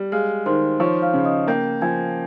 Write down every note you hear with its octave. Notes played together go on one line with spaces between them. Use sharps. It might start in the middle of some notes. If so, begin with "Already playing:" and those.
Already playing: G3
G#3 F5 F6
D#3 C5 C6
F3 C#5 C#6
F5 F6
C#3
D#5 D#6
A#3 G5 G6
F3 G#5 G#6